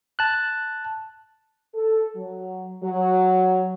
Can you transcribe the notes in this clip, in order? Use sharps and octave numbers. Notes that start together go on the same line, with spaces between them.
A5 F#6
A4
F#3
F#3